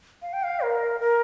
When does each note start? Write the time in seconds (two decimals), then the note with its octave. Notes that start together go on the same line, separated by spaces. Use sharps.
0.22 F5
0.33 G5
0.43 F5
0.61 A#4
1.00 A#4